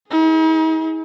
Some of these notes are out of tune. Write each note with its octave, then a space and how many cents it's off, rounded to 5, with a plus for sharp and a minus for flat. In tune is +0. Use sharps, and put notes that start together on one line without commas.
D#4 +45 G#4 +0